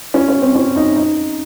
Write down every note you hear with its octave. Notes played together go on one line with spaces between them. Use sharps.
C#4
C#4
C4
C#4
D#4
D#4